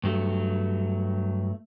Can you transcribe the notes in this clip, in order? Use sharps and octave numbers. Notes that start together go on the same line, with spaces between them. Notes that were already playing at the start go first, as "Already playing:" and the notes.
G2 F#3 A3